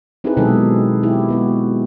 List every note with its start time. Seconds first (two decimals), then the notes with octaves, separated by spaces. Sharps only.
0.24 C4 D#4 E4 G4 G#4 B4
0.37 B2 D#3 F#3 G#3 G#4 A4
1.03 E4 G4
1.29 G#3 B3 F#4